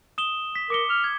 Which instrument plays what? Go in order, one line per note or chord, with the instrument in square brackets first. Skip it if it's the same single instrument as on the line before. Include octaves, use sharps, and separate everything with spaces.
[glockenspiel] D#6 E7 G7
B6
[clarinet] A#4 [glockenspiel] D6 C#7 G7
[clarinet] F6
[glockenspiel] G#6